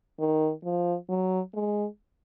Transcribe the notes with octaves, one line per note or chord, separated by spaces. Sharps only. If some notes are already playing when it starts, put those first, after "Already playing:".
D#3
F3
F#3
G#3